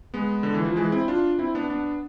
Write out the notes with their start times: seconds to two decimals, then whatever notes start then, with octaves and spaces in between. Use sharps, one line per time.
0.14 G#3 B3
0.43 D3
0.54 E3
0.65 F3
0.76 E3 G#3
0.92 C4 E4
1.08 D4 F4
1.39 C4 E4
1.55 B3 D4
1.70 B3 D4